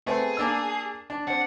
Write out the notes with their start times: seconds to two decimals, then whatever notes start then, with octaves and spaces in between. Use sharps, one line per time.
0.07 A3 B3 C4 G#4
0.37 A#3 D4 E6
1.10 D4
1.28 C4 D4 F#5